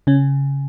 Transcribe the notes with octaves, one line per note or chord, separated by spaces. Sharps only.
C#3 C#4